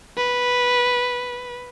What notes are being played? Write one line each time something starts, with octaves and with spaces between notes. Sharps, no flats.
B4